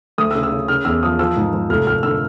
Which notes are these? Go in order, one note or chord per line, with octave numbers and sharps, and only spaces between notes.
D2 D#6
E6
C#3
E6
C#3
C#3 F6
E2 E6
F3 D#6
F3 E6
G#2
F3
F1 F6
F1 F6
D3 E6